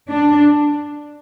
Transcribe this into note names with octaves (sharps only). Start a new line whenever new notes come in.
D4